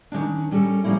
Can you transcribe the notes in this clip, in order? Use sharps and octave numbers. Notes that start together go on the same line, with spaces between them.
D#3 A#3 C#4 D4
G3 C#4 A4 A#4
F3 G3 A#3 C#4 E4